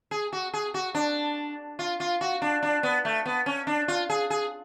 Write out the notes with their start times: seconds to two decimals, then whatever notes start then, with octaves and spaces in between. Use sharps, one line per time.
0.11 G#4
0.33 F#4
0.53 G#4
0.74 F#4
0.95 D4
1.79 F4
2.00 F4
2.21 F#4
2.42 D4
2.63 D4
2.83 B3
3.05 A3
3.26 B3
3.46 C#4
3.67 D4
3.88 F4
4.09 G#4
4.30 G#4